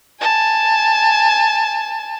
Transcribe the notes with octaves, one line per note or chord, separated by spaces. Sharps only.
G#5 A5